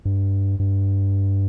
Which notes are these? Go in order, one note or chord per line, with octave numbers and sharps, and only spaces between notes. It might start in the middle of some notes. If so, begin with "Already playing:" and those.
G2
G2